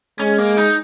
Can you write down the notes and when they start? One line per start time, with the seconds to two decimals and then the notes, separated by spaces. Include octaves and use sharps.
0.20 G#3 C#4
0.38 A#3
0.57 D#4